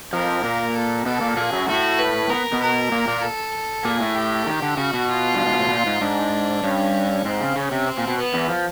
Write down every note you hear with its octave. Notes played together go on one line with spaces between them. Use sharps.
F2 F3 A#4
A#2 A#3
A4
B2 B3 A4
A#2 A#3
A#2 A#3 G#4
F#2 F#3
A2 A3 F#4
B4
B3 A#4
B2 B3
A#4
A#2 A#3
A#2 A#3
A4
A#2 A#3 G#4
A2 A3
G4
D#3
D3
C#3 F#4
B2
F4
G2
G#2
A2
A#2
G#2
G#2 D4
G2 C#4
G#2 C4
C#3
C#3 C#4
C3
C4
A#2
B2
B3
E2 E3
F3